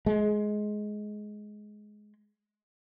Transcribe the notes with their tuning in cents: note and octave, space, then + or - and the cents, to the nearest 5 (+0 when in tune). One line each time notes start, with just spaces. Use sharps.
G#3 +15